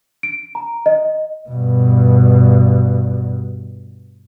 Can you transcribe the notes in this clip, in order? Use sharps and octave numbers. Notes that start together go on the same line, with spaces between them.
D7
A#5
D#5
G2 B2